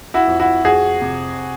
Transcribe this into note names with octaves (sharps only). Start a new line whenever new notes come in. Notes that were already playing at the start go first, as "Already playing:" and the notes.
E4 F#4
F2
E4 F#4
F2 F#4 G#4
C3